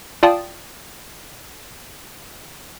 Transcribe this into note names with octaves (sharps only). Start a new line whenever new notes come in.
F4 D5 F5 G5 A5 D#6